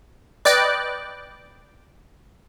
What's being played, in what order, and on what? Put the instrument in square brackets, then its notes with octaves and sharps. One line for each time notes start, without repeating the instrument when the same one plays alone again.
[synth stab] B4 D5 D#5 G5 D6 F#6